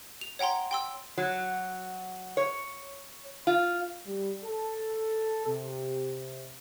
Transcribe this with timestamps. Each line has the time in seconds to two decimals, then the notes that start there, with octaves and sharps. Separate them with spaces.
0.21 F7
0.39 C#5 F#5 G5 A#5 C6
0.71 G5 C6 E6
1.18 F#3
2.37 C#5
3.47 F4
4.06 G3
4.44 A4
5.46 C3